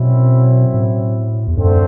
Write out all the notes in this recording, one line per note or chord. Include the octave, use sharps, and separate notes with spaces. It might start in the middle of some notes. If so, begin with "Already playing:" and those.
Already playing: F#2 B2 F#3 C4 E4
A2
E2
F#2 D3 A3 C4